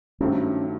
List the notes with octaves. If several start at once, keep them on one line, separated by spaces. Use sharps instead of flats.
G2 D#3 F#3 A3 C4 C#4